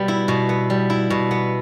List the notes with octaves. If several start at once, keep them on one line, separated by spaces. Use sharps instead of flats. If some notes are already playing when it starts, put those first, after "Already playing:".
Already playing: B2 G3 B3
E4
B2
B3
G3
E4
B2
B3